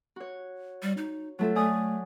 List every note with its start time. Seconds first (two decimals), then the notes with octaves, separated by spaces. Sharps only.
0.16 F#4 C#5
0.82 G3
0.97 D#4
1.39 F#3 A3 F4 A4
1.56 A3 D5 G#5 D#6